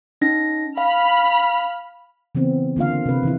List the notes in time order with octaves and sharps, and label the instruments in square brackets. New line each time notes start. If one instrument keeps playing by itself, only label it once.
[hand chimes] C#4 D#4 A#6
[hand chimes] F5 [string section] B5 F6
[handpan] C#3 E3 B3 C4
D3 A#3 F4 F5
C3 B4
D#3 E3 E4